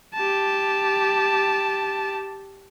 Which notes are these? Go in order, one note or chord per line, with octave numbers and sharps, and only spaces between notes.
G4 A5